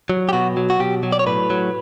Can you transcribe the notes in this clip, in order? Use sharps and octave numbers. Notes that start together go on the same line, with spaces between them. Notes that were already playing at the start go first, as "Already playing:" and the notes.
F#3
G4
B2 F#4
F#3
F#4
B2 G4
F#3
D5
C#5
A2 B4
F#3